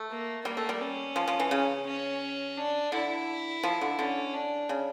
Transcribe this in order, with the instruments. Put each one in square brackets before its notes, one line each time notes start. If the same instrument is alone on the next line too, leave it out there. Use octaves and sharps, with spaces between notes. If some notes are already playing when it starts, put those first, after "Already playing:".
Already playing: [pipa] A3
[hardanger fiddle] A#3
[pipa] G3 [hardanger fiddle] A#3
[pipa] A3
G3
[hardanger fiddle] C#4
[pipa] F3
F3
E3
C#3
[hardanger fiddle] C#4
D4
[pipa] D3 [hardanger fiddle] E4
[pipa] F3
D3
[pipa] D3 [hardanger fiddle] C#4
[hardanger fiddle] D4
[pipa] C#3